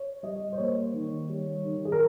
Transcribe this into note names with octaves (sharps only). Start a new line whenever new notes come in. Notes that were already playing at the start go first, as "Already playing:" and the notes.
Already playing: C#5
G3 D#5
C5
A#3 C#5
D#3
G3
D#3
G#4
A#4